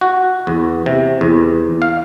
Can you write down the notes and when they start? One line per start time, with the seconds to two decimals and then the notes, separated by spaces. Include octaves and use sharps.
0.01 F#4
0.47 E2
0.86 C3
1.21 E2
1.82 F5